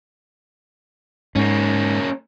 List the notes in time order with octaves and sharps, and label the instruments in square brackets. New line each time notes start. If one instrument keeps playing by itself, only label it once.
[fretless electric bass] G#2 [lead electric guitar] A#3 C#4